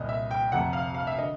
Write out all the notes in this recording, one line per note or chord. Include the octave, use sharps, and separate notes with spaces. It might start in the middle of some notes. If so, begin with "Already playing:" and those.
Already playing: C2 A#2 D#5
E5
G5
F1 F2 C3 F#5
F5
F5
E5
D3 D#5